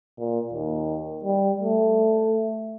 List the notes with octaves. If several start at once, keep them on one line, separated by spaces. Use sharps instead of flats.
A#2
D#2
G3
A3